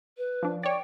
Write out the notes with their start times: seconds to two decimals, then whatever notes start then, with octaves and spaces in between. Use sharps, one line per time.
0.17 B4
0.43 F3 D4
0.63 C#5 D5 G5